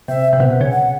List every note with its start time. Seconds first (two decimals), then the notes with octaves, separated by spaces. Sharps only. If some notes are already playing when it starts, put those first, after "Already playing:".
0.08 C3 E5
0.33 C3
0.40 B2
0.50 B2
0.61 C#3
0.72 F#5